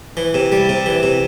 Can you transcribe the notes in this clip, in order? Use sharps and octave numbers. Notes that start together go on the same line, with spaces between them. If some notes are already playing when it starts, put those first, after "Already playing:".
E3
C3
G3
C3
E3
C3